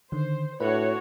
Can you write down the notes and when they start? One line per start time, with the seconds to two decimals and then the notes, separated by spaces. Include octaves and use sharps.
0.12 D3 D#3 C5
0.60 A2 D4 F#4 B4 C#5